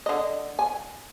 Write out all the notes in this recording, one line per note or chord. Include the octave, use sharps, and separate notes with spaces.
D3 D#5
G#5